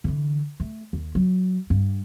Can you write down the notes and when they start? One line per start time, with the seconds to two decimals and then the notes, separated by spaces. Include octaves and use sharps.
0.04 D3 E3
0.60 A3
0.93 D#2
1.15 F#3
1.70 G2